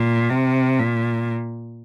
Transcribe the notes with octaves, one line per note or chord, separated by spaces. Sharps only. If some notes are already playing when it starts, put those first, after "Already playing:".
Already playing: A#2
C3
A#2